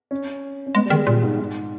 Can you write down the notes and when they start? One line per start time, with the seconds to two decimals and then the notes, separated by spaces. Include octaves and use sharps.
0.11 C#4
0.67 C#4
0.75 G#3 B3
0.86 G3
0.90 D#3 G#3
1.07 A#2 G3
1.23 G#2
1.39 G#2